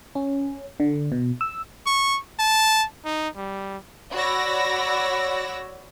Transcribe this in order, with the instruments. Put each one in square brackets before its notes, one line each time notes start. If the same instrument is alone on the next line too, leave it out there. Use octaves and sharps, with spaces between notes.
[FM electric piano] C#4
D3
B2
E6
[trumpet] C#6
A5
D#4
G3
[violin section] F#4 C#5 D5 B5 E6 A#6